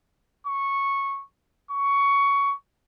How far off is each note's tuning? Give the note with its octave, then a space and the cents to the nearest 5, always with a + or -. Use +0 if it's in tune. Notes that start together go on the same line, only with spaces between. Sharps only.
C#6 -10
C#6 +15